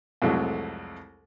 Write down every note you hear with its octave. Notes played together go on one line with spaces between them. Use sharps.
C2 F2 E3 F#3 G#3 A3